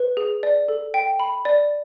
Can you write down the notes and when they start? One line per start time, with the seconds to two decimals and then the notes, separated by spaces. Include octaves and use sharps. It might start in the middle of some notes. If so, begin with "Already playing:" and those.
Already playing: B4
0.17 G#4
0.43 D5
0.68 A4
0.94 G5
1.20 B5
1.45 D5